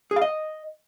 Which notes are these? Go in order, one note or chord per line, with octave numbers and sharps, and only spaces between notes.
G#4
F5
D#5